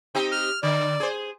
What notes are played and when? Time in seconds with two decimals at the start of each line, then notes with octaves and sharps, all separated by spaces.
0.15 C4 D#4 G4
0.32 F6
0.63 D3 D5
1.00 G#4 C5